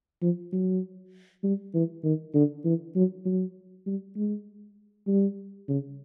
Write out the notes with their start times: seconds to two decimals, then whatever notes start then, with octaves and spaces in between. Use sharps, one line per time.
0.22 F3
0.52 F#3
1.44 G3
1.74 E3
2.04 D#3
2.34 D3
2.65 E3
2.95 F#3
3.25 F#3
3.86 G3
4.16 G#3
5.07 G3
5.68 C#3